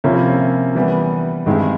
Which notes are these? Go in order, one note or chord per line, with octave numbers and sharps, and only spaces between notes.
C3 F3 A#3 C#4 E4
E3 G3 B3
G2 D#3 G#3 C4 E4